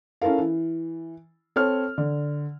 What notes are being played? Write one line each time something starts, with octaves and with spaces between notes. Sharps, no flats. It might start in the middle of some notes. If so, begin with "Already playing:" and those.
C#4 E4 A4 A#4 F5
E3
C4 A4 C#5 F6
D3